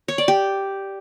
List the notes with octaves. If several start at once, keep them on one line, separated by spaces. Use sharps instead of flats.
C#5
D5
G4